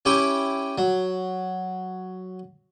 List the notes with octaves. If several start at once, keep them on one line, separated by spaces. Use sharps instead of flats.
C#4 E4 G4 G5
F#3